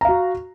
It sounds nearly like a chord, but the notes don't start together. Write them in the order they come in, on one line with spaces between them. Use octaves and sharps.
A#5 F5 F#4